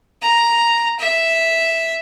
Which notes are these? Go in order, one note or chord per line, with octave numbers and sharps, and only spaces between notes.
A#5
E5